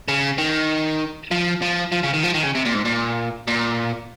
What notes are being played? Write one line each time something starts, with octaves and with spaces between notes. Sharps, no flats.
C#3
D#3
F3
F3
F3
C#3
D#3
F3
D#3
C#3
C3
A#2
G#2
A#2
A#2